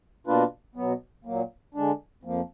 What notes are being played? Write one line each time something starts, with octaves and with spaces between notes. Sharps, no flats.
B2 A#3 D4 F4 B4
B2 F#3 B3
A#2 F#3 A#3
D3 G#3 D4
F2 F3 A#3